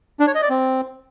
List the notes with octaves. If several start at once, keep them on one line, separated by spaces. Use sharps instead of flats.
D4
C#5
D#5
D5
C4